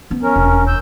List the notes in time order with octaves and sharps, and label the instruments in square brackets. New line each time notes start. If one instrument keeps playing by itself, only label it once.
[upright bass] F3 B3
[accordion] C#4 A#4
[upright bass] E1 D#2
[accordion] E6 G6